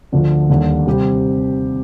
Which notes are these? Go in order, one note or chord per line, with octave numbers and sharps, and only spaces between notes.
D2 D3 F3
D#2 D3 G3
C3 G3 C4 G4